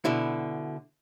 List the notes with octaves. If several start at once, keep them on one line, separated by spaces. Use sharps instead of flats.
B2 D3 E4